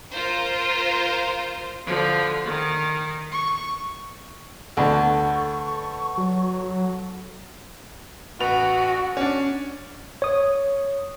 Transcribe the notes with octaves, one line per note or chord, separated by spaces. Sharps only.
F4 A#4 C5
D3 F3
D#3
C#6
D2 D3 A4 B4 F#5 C#6
F#3
A1 F#4 B4 F7
C#4 D4
C#5 D#6